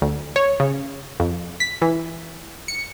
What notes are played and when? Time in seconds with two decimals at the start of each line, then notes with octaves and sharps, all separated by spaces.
0.02 D2
0.36 C#5
0.60 C#3
1.20 F2
1.60 B6
1.82 E3
2.68 C#7